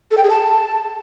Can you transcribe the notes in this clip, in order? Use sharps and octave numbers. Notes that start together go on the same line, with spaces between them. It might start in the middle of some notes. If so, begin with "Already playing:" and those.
A4
G5
G#4
A5